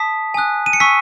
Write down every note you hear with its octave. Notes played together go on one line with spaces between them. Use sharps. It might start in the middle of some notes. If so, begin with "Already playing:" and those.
Already playing: A5 D#6 B6
G#5 D#6 F#6
D#7
C#7
G#5 C#6 E6 B6